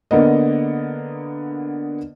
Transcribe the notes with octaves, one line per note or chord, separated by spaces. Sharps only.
D3 A#3 B3 D#5